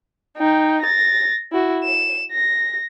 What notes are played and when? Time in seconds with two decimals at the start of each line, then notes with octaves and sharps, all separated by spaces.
0.37 D#4 G5
0.82 A6 A#6
1.52 E4 F#4
1.84 E7
2.32 A#6